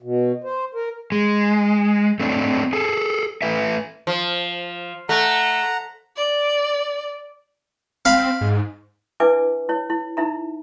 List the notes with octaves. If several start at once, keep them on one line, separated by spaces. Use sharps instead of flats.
B2
C5
A#4
G#3
A3 C4 D4
G#4 A4
A3 B4 E5
F3
A3 F#5 A#5
D5
C4 F5 B5
G#2
D4 E4 B4 E5 G#5 D6
E4 C#5
E4
D#4 E4 E5 A#5